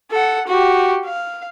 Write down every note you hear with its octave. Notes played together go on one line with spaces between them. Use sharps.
A4 F#5
F#4 G4
F5